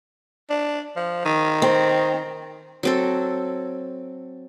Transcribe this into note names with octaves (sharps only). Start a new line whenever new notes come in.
D4
F3
D#3
C4
F#3 C4 A4